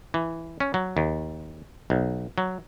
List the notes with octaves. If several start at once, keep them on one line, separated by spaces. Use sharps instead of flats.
E3
C#4
F#3
D#2
B1
F#3